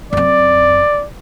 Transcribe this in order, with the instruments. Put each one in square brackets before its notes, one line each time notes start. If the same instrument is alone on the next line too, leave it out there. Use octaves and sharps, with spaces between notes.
[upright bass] F#2 C4 [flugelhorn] D5